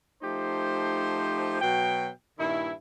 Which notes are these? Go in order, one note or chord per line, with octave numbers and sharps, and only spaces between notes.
F3 A3 D#4 G4 C5
B2 F#3 G5
G2 A#2 D#3 E4